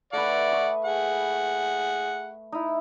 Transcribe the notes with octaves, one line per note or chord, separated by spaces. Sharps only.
A3 B4 D5 F#5
C#6 D#6
G#4 F#5
D#4 E4